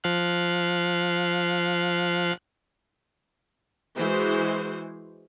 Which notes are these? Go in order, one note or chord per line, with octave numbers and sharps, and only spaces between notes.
F3 F5 F#6
E3 G#3 F#4 C5